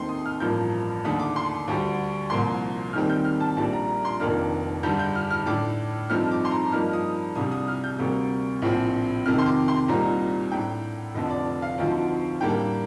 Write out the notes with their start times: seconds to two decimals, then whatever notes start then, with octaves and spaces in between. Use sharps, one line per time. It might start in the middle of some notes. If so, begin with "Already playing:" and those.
Already playing: D#2 D#3 A3 C4 D#4 C6
0.09 D#6
0.26 F6
0.40 A1 G2 F3 A#3 G6
1.04 D#2 D3 A3 D4 D#6
1.20 D6
1.36 C6
1.68 D2 D3 G3
2.30 C2 A#2 F3 A#3 C6
2.93 D#2 D#3 G3 C4 F6
3.10 G6
3.25 F6
3.40 A5
3.57 A#1 A#2 G3 D4 A5
3.73 A#5
3.88 A#5
4.05 C6
4.20 F1 F2 D#3 A#3 D4 F6
4.83 G2 D3 G3 D4 G6
4.99 G6
5.15 F6
5.31 F6
5.46 A2 A3 D4 D6
6.10 G2 F3 A3 C4 D#4 F6
6.31 D6
6.45 C6
6.51 A#5
6.72 G2 F3 A#3 D#4 F6
6.93 D#6
7.35 C2 C3 G3 D4 D#6
7.52 D#6
7.68 F6
7.84 G6
7.99 D2 C3 G3 A#3
8.62 A#1 A2 F3 C4
9.26 F2 C3 D#3 F6
9.38 C6
9.46 D6
9.68 C6
9.88 C2 A#2 G3 C4 D#4 A#5
10.51 A2 A3 D4 G5
11.14 F1 F2 D3 A3 D#5
11.30 D5
11.62 F5
11.78 D2 D3 F3 C4 D#4
12.41 A2 G3 A#3 D4 G5